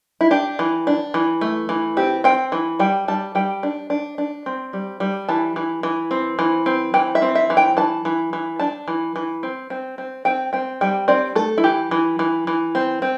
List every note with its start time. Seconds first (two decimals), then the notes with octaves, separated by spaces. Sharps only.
0.21 E4
0.31 D4 G4
0.59 E3
0.87 D4
1.14 E3
1.41 A3
1.69 E3
1.97 C4 G4
2.24 C4 G5
2.52 E3
2.79 G3 G5
3.08 G3 A5
3.35 G3 G5
3.63 D4
3.90 D4
4.18 D4
4.46 C4
4.73 G3
5.00 G3
5.29 E3 A5
5.56 E3
5.83 E3
6.11 C4
6.39 E3
6.66 C4
6.94 E3 G5
7.15 E5
7.22 C4
7.35 E5
7.50 E3
7.57 G5
7.77 E3 A5
8.05 E3
8.33 E3
8.60 D4 A5
8.88 E3
9.16 E3
9.43 C4
9.70 C4
9.98 C4
10.25 C4 G5
10.53 C4 G5
10.81 G3 G5
11.08 C4 D5
11.35 A3 A4
11.58 E4
11.64 E3 G4
11.91 E3
12.19 E3
12.47 E3
12.75 C4
13.02 C4